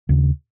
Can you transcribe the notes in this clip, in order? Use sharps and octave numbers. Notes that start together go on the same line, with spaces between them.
D#2 C#3